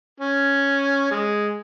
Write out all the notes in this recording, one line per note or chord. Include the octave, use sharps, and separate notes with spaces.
C#4
G#3